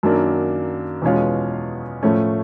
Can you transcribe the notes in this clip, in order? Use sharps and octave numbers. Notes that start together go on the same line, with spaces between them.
F#2 D#3 F#3 A#3 D4
E2 B2 G#3 C#4 F4
A2 F3 A3 C#4